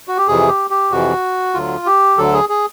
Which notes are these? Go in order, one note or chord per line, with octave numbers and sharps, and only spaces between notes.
F#4
G4
F2 C3 E3 G#4
G4
G4
F2 C3 E3 F#4
D2 D3 F#3 F4
G4
D2 D3 F#3 A4
G#4
G#4